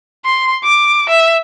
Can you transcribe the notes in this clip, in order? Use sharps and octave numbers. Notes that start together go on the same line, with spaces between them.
C6
D6
E5